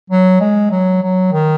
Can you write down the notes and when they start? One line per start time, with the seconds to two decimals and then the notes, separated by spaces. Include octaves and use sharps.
0.10 F#3
0.40 G#3
0.71 F#3
1.03 F#3
1.32 D#3